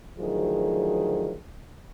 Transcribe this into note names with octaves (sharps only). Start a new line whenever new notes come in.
D2 D#3 F3 F#3 G#4